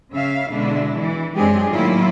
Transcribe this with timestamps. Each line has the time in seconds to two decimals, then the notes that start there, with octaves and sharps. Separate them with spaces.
0.12 C#3 E5 F5
0.50 B2 D3 G#3 D4 E4
1.00 E3
1.35 F#2 G#3 C4 D4 G4 G#4
1.71 A2 D#3 F#3 A#3 E4 F4